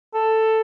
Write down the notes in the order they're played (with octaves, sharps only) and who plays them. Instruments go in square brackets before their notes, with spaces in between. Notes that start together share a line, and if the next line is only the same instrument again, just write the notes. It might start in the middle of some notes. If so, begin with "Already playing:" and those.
[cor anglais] A4